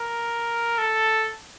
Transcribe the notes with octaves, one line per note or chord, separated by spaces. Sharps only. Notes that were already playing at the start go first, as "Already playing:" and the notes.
Already playing: A#4
A4